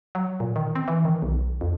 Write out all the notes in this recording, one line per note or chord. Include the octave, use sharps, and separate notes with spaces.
F#3
A#2
D#3
C4
E3
D#3
B1
F2